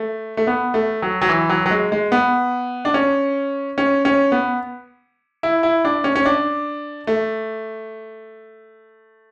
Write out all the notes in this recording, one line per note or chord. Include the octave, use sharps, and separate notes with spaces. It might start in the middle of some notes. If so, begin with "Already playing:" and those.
Already playing: A3
A3
B3
A3
F#3
F#3
E3
F#3
F#3
G#3
G#3
B3
D4
C#4
C#4
C#4
B3
E4
E4
D4
C#4
C#4
D4
A3